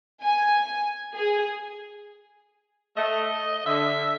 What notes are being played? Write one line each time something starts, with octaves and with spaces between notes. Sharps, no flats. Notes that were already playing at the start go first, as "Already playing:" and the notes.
G#5
G#4
A3 D#5
D3 E5